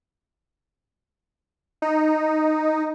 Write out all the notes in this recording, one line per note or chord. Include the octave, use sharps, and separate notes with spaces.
D#4